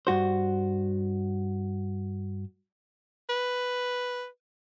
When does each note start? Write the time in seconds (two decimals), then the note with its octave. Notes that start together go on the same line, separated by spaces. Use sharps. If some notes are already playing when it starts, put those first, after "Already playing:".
0.07 G2 F#4 C5
3.29 B4